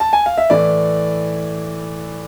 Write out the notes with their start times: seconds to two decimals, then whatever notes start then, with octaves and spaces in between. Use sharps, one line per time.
0.00 A5
0.13 G#5
0.26 F5
0.38 E5
0.50 A2 E3 D5